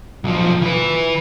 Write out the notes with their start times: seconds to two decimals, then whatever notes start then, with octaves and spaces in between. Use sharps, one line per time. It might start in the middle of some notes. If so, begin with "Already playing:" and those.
0.24 B1 F3
0.61 E3 B4